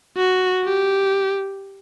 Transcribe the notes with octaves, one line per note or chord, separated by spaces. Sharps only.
F#4
G4